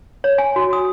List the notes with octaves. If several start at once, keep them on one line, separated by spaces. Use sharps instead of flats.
C#5
G#5
F#4
D#6